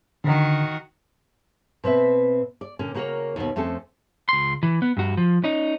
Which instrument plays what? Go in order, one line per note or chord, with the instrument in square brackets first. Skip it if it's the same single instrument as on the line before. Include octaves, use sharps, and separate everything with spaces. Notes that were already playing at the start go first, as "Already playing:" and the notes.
[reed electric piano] D3 [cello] D#3 F#4
[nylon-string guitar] B2 C4 B4 E5
D5
A#2 D3 C#4
C#3 A#3 F#4 A4 A#4 C#5
D#2 B2
F2 A3 C4 C#4 A4
[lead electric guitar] C#2 C6
E3
B3
G2 F#4
F3
C#4 D#4